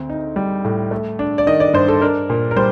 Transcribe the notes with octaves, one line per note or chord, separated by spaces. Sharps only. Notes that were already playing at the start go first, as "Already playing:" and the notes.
Already playing: D2 C4
D#4
G3
A2
A3
D4
D5
D#3 D#5
D5
G2 C5
A4
D4 A#4
A#2
A#4
G3 C5